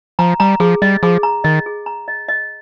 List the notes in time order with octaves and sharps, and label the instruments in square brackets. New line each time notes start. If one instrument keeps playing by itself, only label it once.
[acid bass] F3 [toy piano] A#5
[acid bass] G3 [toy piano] A#5
[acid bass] F3 [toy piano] G#4
[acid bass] G3 [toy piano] D#5
[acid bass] F3 [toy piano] G#4
[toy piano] A#5
[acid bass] D#3 [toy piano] D#5
[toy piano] G#4
A#5
D#5
D#5